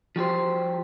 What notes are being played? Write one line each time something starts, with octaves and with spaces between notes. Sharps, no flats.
F3 F#4 G4 C5